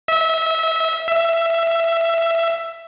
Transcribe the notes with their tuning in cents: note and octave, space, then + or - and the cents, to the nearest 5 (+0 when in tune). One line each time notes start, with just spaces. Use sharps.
E5 -25
E5 +15